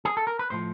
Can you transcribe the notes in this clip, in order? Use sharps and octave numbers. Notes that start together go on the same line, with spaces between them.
G#4
A4
A#4
B4
A2 F3 C5